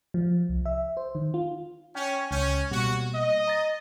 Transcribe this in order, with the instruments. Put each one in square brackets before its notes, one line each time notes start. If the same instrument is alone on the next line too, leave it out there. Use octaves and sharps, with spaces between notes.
[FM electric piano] F3
C2
E5
C5
D#3
F4
[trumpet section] C#4 [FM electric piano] G5
[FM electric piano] C#2 G6 [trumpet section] C#4
[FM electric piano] B2 G3 A#3 [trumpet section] F#4
[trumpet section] D#5
[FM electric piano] A#5 A6 A#6